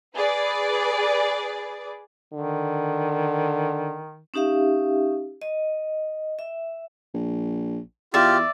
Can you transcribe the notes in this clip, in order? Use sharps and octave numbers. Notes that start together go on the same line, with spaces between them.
G#4 B4 D5
D3 D#3
C#4 D#4 G4 E5 F5
D#5
E5
A#1
E2 F4 G4 D5 E5